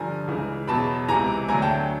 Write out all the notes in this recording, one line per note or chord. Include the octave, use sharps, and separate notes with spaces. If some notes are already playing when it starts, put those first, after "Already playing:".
Already playing: G2 D3 F3 G#5 A#5
C#2 C#3 E3
E2 B2 F#3 A5 B5
C#2 C3 E3 G#5 A#5
D2 D3 F#3 G#5 A#5
G5 A5